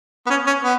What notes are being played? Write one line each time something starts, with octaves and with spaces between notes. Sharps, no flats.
B3
C#4
C#4
B3